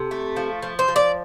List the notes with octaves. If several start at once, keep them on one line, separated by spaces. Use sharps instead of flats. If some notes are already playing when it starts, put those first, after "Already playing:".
Already playing: C3 A4
A3
F3
F3
C5
F3
D5